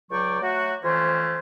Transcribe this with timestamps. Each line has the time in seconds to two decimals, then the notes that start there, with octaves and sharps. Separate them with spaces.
0.11 C#2 F#3 D5 G5 C#6
0.41 F#3 A3 F#4
0.83 F2 E3 A3 C#4 C5